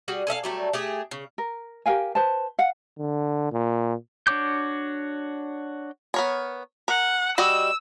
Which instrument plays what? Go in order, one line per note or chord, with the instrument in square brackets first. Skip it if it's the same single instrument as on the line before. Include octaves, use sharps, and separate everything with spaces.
[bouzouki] G3 F#4 G#4
G#4 A4 E5 F5
F#3 G3 A3
A3 G4 G#4
C#3
[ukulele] A#4
G4 A#4 F5 G#5
B4 C5 A5
F5 F#5
[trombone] D3
A#2
[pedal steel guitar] D4 F#4 C#5 D6 G6
[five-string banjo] B3 A#4 C#5
[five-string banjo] A#4 [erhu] F#5
[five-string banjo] G3 F#4 D#5 [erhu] E6